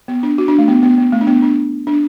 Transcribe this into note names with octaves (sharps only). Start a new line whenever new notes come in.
B3
D4
F#4
D4
A3
B3
B3
B3
A3
D4
B3
D4
D4